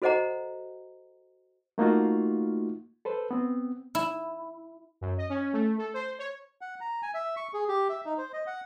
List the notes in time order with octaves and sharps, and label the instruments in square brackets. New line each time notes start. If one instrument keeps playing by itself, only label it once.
[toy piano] F#4 A4 C5 D#5 F#5 A#5
[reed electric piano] A3 A#3 D#4 F4 F#4
A4 B4 C5
B3 C4
[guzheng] E4
[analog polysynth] F#2
D#5
C#4
A3
A4
C5
C#5
[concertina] F#5
A#5
G#5
E5
C#6
G#4
G4
E5
D#4
C5
D#5
F#5